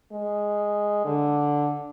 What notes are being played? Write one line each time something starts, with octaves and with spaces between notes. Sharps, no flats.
G#3
D3